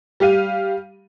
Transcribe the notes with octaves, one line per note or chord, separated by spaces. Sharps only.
G3 G4 F5 D#7